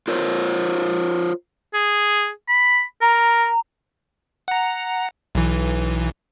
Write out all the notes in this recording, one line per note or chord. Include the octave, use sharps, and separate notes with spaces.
F4 A#4 C5 C#5
G#4
B5
A#4 A#5
F#5 A#5
B1 E3